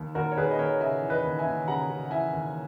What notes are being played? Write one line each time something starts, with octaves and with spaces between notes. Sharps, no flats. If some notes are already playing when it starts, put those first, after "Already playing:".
Already playing: D#2
D#2 F#4 A#4
C#5
D#2 G#4 B4
D#5
D#2 A#4 C#5
C#3 E5 G#5
E3
B4 D#5
D#2
E5 G#5
D#2
C#3 F#5 A#5
C#3
F#5
E3 E5 G#5
D#2